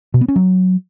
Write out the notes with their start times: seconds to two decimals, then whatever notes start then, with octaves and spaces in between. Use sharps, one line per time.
0.14 B2
0.21 B3
0.28 C#4
0.36 F#3